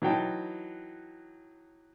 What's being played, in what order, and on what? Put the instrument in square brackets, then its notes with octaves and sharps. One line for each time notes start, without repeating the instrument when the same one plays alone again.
[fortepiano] E3 F#3 D#4 G5 A5